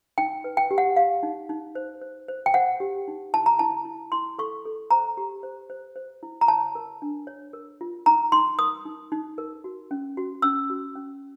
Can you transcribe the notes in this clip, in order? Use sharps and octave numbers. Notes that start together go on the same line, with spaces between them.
D#4 G5
B4
G5
G4
F#5
G4 F5
D#4
D#4
C5
C5
C5
G5
C5 F#5
G4
D#4
E4 A5
A#5
E4 A5
E4
E4 C6
A4 C#6
A4
C5 A#5
G4
C5
C5
C5
E4
A#5
C#5 A5
A#4
D4
C#5
A#4
F4
D#4 A#5
D#4 C6
A#4 D#6
D#4
D#4
A#4
F#4
C#4
F#4
C#4 E6
F#4
C#4